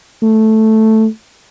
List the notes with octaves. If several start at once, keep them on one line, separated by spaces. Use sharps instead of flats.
A3